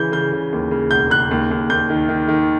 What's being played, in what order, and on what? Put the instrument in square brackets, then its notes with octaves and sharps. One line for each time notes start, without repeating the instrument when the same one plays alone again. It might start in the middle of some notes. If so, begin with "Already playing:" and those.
Already playing: [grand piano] C#3 E3 G6
C#3 G6
C#3
D#2
C#3
E1 G6
C#3 F#6
D#2
D#2
D#2 G6
D#3
D#3
D#3